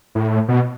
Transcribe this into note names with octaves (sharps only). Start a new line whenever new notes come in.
A2
B2